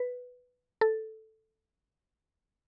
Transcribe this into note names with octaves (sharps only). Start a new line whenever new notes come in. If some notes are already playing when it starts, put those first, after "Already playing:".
Already playing: B4
A4